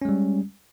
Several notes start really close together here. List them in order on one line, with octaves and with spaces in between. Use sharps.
C#4 G#3 G3